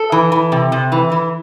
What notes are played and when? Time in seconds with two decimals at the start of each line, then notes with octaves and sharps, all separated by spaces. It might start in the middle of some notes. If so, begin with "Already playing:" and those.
Already playing: A4
0.12 E3
0.32 E3
0.52 C3
0.72 C3
0.92 E3
1.12 E3